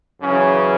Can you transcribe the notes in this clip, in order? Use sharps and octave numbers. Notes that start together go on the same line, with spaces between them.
F#2 C#3 E3 C#4